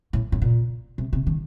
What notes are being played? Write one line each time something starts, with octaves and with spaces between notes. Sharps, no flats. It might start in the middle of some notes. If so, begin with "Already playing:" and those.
A2
A2
A#2
C3
C3
D#3